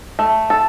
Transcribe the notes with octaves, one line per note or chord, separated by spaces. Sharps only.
A3
A4